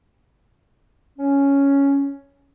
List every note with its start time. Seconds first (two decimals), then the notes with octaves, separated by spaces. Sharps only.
1.19 C#4